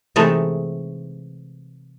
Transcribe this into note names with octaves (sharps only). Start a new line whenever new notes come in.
C3 E3 G#3 A3 D#4 A4